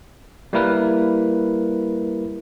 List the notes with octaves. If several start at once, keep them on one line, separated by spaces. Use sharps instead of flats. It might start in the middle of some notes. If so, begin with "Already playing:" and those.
G3 A#3 E4 A#4 B4